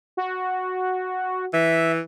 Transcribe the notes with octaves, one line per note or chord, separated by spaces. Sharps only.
F#4
E3 E5